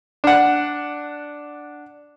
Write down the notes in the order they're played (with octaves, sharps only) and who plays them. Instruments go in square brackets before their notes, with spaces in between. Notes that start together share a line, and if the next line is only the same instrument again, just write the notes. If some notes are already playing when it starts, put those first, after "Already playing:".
[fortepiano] D4 F#5